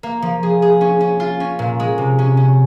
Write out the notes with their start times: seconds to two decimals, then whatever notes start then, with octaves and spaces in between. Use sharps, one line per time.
0.03 A#3
0.22 F3
0.43 G#4
0.62 G#4
0.81 C#4
1.01 C#4
1.20 F4
1.40 C#4
1.59 A#2
1.80 G#3
1.98 C3
2.19 C#4
2.37 C#4